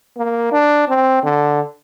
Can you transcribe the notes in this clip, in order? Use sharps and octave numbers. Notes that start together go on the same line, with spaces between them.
A#3
D4
C4
D3